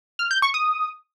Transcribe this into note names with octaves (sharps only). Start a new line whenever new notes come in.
F6
G6
C#6
D#6